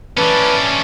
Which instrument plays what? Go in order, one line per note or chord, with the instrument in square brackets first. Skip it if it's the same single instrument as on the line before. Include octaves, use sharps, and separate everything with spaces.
[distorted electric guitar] E3 C#4 [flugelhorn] B4 [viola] D5 A5